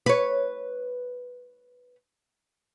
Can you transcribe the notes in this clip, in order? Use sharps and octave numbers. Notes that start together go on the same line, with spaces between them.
B4 C#5